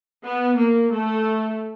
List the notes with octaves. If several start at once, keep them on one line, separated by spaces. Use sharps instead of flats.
B3
A#3
A3